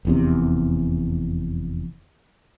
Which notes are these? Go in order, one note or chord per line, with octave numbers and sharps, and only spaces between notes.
F1 E2 C3